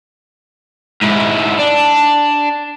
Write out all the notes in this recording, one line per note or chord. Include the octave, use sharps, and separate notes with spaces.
G#2 E4
D4